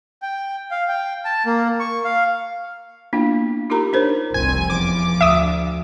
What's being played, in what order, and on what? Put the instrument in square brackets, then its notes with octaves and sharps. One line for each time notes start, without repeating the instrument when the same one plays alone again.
[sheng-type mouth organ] G5
F5
G5
A5
A#3
C#6
F5
[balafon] A#3 B3 D4 E4 F4 F5
D#4 F4 G4 A#4 A#5 B5
D4 A#4 C5 C#5
[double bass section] F1 C2 C4 [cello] F3 [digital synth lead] G#5
[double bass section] E2 [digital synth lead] D6
[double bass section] D2 [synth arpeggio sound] E5 D#6